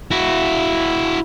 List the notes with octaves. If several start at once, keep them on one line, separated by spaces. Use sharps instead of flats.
E4 F#4